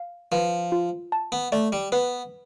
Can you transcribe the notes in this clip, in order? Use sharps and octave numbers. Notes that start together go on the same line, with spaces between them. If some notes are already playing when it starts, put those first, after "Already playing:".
Already playing: F5
F3 B4
F4
A5
B3
A3 D5
G3
B3 B4